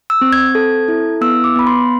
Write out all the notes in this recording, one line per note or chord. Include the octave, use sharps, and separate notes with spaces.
E6
C4
G#6
A4
E4
B3 E6
D6
B3 B5
C6